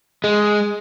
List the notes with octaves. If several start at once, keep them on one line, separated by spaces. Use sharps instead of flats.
G#3